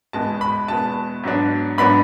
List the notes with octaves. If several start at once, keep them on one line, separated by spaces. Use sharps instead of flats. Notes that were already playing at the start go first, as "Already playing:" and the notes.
E2 B2 G#3 B3 A5
B5
E2 B2 G#3 B3 A5
G#2 F#3 B3 D4
G#2 F#3 B3 D4 B5